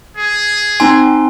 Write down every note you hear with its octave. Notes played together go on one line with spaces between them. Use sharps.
G#4
C4 D#4 G#5 C6